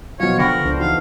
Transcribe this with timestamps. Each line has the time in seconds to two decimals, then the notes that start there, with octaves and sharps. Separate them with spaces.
0.20 B2 F3 F#3 F4 C#5 F5
0.39 D3 B3 A4 A#4 F#5 G5 B5 C#6
0.65 C#2 D4 C5
0.80 E3 D#4 F#4 F5